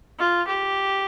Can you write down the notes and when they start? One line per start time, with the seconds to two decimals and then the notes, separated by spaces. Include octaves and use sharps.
0.19 F4
0.47 G4